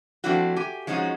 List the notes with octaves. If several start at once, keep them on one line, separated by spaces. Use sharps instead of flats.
F3 A3 C4 D4 E4 F#4
G4 G#5
F3 G#3 C#4 D#4 F4 F#4